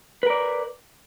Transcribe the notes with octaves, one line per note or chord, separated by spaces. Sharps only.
A#4 B4 D5